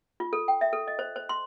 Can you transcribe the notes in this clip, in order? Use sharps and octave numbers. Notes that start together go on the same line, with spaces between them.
F4
A4
G5
E5
A4
D#5
C5
C5
C6